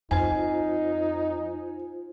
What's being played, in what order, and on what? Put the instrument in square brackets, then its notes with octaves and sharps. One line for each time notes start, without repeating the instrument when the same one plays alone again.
[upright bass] F2 [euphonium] D#4 [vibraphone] F4 C5 [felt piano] G#5